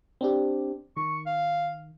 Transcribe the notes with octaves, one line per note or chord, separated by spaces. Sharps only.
C4 D4 G4
D#3 C#6
F5